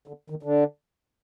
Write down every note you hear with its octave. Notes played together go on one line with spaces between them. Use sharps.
D3
D#3
D3